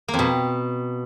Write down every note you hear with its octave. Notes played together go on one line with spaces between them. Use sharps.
A#3
F2
B2